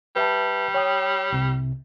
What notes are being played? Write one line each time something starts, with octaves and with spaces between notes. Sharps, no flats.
G3 B4 E5 A5
C#5 G5 D#6
C2 C3